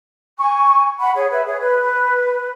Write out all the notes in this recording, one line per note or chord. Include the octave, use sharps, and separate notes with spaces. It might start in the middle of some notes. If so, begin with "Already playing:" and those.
G#5 C#6
F#5 B5
G#4 C#5
B4 E5
G#4 C#5
B4